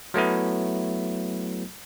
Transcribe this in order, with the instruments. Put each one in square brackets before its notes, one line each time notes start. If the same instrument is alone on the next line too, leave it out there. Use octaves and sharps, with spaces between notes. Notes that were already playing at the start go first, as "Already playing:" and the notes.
[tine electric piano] F#3 A3 B3 E4